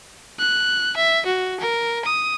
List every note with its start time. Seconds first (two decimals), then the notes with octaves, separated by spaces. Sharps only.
0.39 F#6
0.96 E5
1.26 F#4
1.60 A#4
2.05 D#6